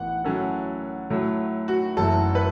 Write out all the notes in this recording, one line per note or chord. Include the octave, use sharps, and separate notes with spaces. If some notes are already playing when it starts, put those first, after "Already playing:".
Already playing: A1 A2 E3 B3 F#5
A2 F#3 C#4 A4
A2 F#3 A3
F#4
F#1 F#2 E3 A3 A4
B4